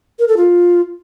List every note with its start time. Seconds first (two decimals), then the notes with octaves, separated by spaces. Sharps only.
0.19 A#4
0.28 A4
0.37 F4